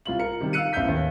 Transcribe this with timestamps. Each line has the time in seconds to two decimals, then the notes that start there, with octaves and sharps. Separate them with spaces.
0.05 C2 F4 F#7
0.19 A#4 C#7
0.40 C3 D#3 G3
0.53 F5 E6 F#6 C#7 D#7
0.73 A1 E2 E5 F5 G6 B6
0.88 D#2